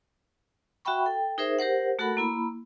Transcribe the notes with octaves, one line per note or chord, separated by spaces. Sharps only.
F#4 E5 F#5 G5 B5 C#6
A4 G5
D#4 G#4 A#4 C5 E5
G4 A#4 C5 F#5
A3 F#4 A4 A#4 F#5 B5
A#3 E4 B5